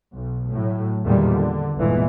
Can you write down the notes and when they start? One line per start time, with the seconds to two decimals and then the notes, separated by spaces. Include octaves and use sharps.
0.14 B1
0.50 A2 F#3
1.04 E2 A#2 D3 D#3 G3
1.33 D3
1.77 G1 E2 A#2 E3 G#3